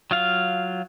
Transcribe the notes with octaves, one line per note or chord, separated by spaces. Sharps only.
F#3 F4 F5